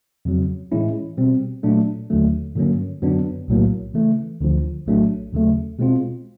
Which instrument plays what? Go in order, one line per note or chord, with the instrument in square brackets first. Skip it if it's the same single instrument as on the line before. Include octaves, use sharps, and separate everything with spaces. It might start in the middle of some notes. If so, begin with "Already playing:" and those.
[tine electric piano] F2 C#3 F#3
A2 E3 G#3 C#4 E4
B2 G3 C4
A#2 F#3 A3 D4
D#2 D3 F#3 A3
G2 D3 F#3 A#3 C#4
F#2 D3 F#3 B3 D4
B1 A2 F#3 A#3
C#3 E3 A3
D2 D3 F3
A#1 A2 F#3 A3 D4
D#2 C#3 F#3 A3
B2 G#3 C4 F4